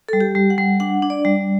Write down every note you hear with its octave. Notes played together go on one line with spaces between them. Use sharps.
G3 A4
G4
G3
F#5
G3
D4 F#5
D4
D5
G3